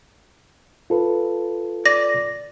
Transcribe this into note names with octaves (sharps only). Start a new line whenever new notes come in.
F4 A4 B4
D5 A#6